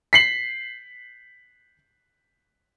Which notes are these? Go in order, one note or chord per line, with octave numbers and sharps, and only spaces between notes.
B6 C7 F#7